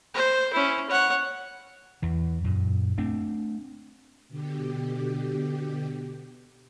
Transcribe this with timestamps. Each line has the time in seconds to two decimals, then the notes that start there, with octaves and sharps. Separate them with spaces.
0.14 C5
0.53 C#4 E4
0.90 C#5 F#5
2.02 E2 E3
2.44 F#2 A#2
2.98 A3 C4 D4
4.29 B2 D3 G4